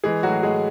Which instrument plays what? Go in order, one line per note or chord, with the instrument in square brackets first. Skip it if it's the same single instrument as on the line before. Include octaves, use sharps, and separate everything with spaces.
[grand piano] E3 G#3 G#4
A2 F#3 F#4
A2 G#3 G#4